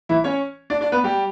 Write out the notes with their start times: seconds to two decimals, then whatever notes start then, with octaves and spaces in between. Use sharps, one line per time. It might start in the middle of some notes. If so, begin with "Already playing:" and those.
0.09 E3 E4
0.24 C#4 C#5
0.70 D4 D5
0.81 D4 D5
0.92 B3 B4
1.04 G3 G4